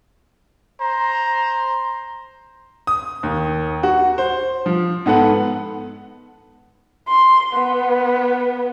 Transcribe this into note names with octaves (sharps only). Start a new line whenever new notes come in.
C5 A#5
D#6
D#2
F#4
C5
F3
G#2 B3 A4 F#5
C6
B3